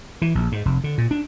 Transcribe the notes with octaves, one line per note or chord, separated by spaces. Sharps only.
E3
A#1
G#2
F1
D3
A#2
D4